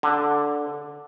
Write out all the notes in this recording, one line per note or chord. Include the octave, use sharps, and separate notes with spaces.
D3